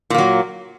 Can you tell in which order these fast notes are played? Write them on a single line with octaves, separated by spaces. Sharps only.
A#2 A#3 F#3